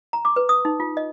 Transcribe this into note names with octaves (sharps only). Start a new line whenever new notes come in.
A#5
D6
B4
D#6
D#4
F4
D#5